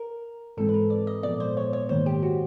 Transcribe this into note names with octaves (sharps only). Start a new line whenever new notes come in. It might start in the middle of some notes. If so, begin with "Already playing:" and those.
Already playing: A#4
G#2 E3 G#3 C4 A4
B4
A#4
D5
D#5
A#2 F3 G#3 B3 D5
C5
C#5
C#5
G#2 D#3 G3 A#3 C5
G4
F#4